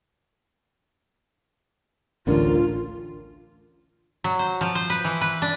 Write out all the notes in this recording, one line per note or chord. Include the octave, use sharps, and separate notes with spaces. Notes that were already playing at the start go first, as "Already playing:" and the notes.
A1 D2 D3 C#4 D4 F4 A#4
F#3
C5
F3
C5
B4
E3
B4
D4